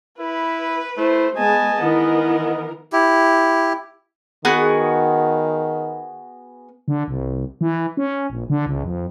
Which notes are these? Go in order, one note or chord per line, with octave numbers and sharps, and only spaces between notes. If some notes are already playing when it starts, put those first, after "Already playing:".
E4 B4
A3 E4 C5
G#3 B3 D#5 G#5 A5
D#3 E3 B3 A#4
E4 G4
D#3 B3 F#4 G#4
D3
C2
E3
C#4
A#1
D3
C#2
F2